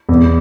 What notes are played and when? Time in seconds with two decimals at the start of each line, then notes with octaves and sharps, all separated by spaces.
0.09 E2